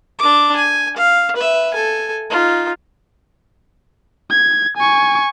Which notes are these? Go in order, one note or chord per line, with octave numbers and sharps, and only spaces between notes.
D4 D6
G#5
F5
B4 E5
A4 G#5
D#4 F4
G#6
G#5 C#6